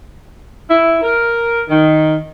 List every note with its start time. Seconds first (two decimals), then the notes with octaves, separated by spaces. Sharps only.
0.69 E4
1.02 A#4
1.68 D#3